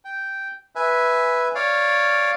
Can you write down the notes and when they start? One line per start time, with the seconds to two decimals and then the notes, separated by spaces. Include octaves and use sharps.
0.05 G5
0.75 B4 E5 G#5
1.55 C#5 D5 F5